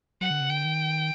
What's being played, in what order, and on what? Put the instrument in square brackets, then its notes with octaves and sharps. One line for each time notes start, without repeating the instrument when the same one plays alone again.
[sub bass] F#3 [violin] F#5
[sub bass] D3
C#3
[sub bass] D3 [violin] G5
[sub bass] D#3